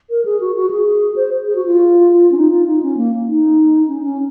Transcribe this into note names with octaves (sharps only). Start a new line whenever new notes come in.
A#4
G#4
F#4
F#4
G#4
C5
G#4
F#4
F4
C#4
D#4
F4
D#4
C#4
A#3
D#4
C#4
C#4